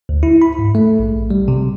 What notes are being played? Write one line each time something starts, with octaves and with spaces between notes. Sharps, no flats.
D2
E4
B5
G#2
A3
A#1
G3
C3